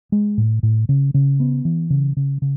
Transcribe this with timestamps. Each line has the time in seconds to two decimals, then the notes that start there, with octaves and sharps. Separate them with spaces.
0.12 G#3
0.38 A2
0.63 A2
0.89 C#3
1.14 C#3
1.40 B3
1.65 E3
1.90 C#3
2.17 C#3
2.42 C#3